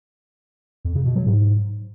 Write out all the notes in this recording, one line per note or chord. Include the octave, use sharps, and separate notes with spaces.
F2
C#3
B2
F#3
G#2